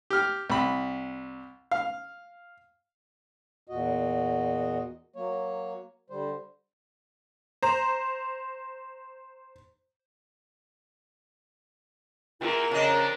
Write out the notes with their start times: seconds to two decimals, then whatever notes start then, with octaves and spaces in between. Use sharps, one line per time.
0.10 G4 F6
0.50 C2 B5
1.72 F5
3.67 E2 A#2 F#4 D#5
5.16 F#3 A#3 C#5
6.10 D3 G3 C5
7.63 C5 A#5
12.40 E2 F4 A#4
12.71 G2 C#3 F3 D4 D#5 A#5